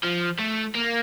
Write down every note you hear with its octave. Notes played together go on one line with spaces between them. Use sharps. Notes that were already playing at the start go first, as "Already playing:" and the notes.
F3
A3
A#3